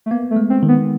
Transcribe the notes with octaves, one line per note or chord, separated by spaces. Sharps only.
A3
A#3 B3
A3
G#3
C4
D#3
B3